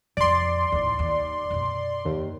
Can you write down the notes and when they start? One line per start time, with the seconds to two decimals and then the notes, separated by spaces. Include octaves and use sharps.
0.17 A#1 F2 D5 C6
0.72 A1 D#2
0.99 D#2
1.51 F#2 B2
2.05 D#2